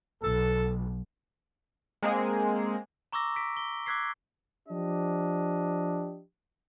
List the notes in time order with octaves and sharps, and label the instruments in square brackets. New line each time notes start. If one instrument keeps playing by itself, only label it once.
[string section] B1 [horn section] A4
[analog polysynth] G#3 A#3 C4 G#4
[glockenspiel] A#5 C#6 D6 E6 A#6
B6 D7
G7
D6 E6 F#6 G#6 B6 C7
[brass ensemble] F3 D4 G4 D#5